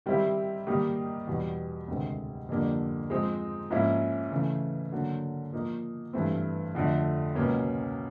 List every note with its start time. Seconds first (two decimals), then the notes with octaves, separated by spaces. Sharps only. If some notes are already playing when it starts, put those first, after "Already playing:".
0.06 D#3 G3 C4 E4 G4
0.67 D#3 G3 A#3 D#4 G4
1.27 E2 B2 G3
1.88 D2 C3 D#3 G#3 C4
2.49 F2 D3 G3 A#3 D4
3.10 F3 G#3 C4 D#4
3.70 G#2 F3 A#3 C#4 E4
4.31 C#3 E3 A3
4.92 D3 F#3 A#3
5.53 A#2 F3 A#3 D#4
6.13 G2 E3 A3 C4
6.75 F2 D3 F3 A3
7.35 C#2 B2 F#3 A#3 C#4